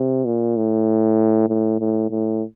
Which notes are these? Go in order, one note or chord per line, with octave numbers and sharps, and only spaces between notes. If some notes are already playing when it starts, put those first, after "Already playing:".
Already playing: C3
A#2
A2
A2
A2
A2